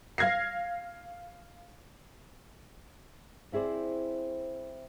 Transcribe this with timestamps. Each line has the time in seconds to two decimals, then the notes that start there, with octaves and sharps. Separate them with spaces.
0.18 F5 F6 G#6 A#6 C7
3.52 C4 E4 G#4 C5 D5